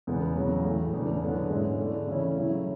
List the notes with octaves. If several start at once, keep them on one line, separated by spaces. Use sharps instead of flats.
E2 C#3 G#3 B3
E2 C#3 F#3
A2 E3 A3
E2 C#3 G#3 D4
D3 F#3 B3 D4
G#2 G#3 C#4 E4
D3 A3 D4
C#3 E3 A3 C#4 E4
C#3 F#3 A3 E4